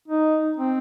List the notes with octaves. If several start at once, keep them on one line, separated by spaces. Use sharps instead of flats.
D#4
C4